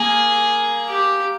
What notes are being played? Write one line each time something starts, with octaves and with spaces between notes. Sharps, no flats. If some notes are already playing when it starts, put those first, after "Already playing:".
Already playing: A#3 G#4
G4